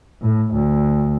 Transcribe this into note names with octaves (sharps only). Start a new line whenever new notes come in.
A2
D2